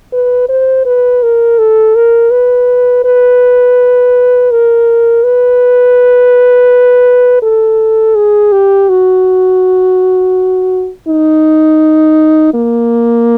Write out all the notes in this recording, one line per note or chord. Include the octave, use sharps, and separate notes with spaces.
B4
C5
B4
A#4
A4
A#4
B4
B4
A#4
B4
A4
G#4
G4
F#4
D#4
A#3